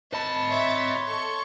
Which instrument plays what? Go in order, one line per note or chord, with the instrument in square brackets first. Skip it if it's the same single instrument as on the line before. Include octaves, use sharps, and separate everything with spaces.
[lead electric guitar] D#5 B5 [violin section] A5
[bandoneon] C#5 C6 [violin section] E5 A6
[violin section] A4 C#6